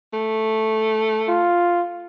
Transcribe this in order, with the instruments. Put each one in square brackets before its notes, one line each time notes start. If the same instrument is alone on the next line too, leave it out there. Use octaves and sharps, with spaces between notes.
[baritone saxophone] A3
[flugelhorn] F4